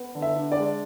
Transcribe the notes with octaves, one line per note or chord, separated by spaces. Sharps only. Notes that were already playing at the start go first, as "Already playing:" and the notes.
Already playing: B3
D3
E5
D4
D5
G#3